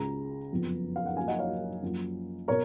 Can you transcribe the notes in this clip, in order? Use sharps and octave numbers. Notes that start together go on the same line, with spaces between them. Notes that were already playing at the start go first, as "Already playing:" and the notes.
Already playing: C#2 C#3 G#3 A#5
F#1 F2 F3 B3
F5
F#5
F#1 F#2 F3 A#3 F5 G#5
D#5 F#5
C#5 F5
F#2 F3 A#3
B2 A#4 C#5